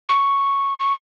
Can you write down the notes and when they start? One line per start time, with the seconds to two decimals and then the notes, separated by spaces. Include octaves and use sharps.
0.09 C#6
0.80 C#6